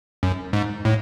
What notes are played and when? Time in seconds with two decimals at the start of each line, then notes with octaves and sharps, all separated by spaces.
0.23 F#2
0.53 G#2
0.85 A2